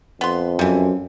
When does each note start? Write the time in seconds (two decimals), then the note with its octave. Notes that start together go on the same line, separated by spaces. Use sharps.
0.21 F2 B3 C6
0.59 F#2 C3 E3